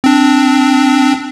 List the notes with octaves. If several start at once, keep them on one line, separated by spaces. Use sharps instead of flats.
C4 D4